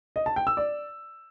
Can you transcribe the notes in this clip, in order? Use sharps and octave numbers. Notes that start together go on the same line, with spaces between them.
D#5
A5
G5
E6
D5